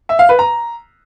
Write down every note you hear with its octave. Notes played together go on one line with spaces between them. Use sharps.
E5
F5
B4
A#5